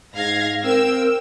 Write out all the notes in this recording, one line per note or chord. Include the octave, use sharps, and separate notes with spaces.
G#2 F5 G#6 A#6
C4 A#4 G5 E6